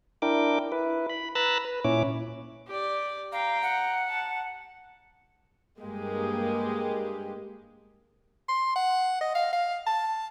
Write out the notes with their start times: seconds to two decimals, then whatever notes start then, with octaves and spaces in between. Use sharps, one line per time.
0.22 D4 E4 A#4 G5 D6
0.72 E4 B4
1.10 B5
1.35 B4 A#5 B5 E6 F#6 A6
1.65 B4
1.84 A#2 C#4 E4 C#5 D6
2.67 G4 D5
3.32 F5 G5 A#5
3.62 F#5
4.09 A5
5.81 G2 G#3 A#3 G4
8.48 C6
8.76 F#5
9.21 D#5
9.35 F5
9.53 F5
9.87 A5